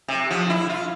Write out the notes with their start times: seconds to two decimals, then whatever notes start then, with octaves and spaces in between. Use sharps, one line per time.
0.08 C3
0.31 F3
0.50 E4
0.70 F4